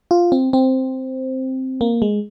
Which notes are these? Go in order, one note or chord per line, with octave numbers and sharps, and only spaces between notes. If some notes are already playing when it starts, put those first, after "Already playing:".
F4
C4
C4
A#3
G#3